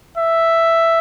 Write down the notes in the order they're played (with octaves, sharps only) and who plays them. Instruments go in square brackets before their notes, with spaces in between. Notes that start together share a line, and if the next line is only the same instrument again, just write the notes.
[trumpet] E5